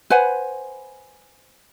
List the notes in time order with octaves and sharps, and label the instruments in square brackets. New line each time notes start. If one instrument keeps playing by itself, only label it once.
[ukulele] B4 C5 F#5 G#5